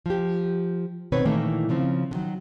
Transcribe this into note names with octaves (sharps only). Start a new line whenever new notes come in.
F3 G4
B2 D#3 C4 B4 C#5
A#2 D#3 E3 A3 A#3
C#3 F3 C4
D3 D#3 F#3